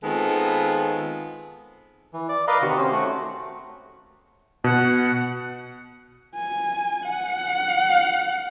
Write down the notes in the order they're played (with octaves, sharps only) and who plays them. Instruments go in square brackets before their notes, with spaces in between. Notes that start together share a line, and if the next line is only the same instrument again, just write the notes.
[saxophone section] D#3 G#3 B3 C4 F4 A4
[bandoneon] E3
D5
A#4 B4 D5 D#5 F5
C3 D#3 F#4
C4 C#4
A3 F#4
[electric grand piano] B2 [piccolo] F#5
[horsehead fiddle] G#5
F#5